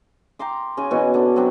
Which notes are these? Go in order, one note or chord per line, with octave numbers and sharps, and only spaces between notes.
G5 A#5 C6 D6
C#3 C#4 G#4 G#5
B2 E3 F#4
D3 D4
F#3 C4 D4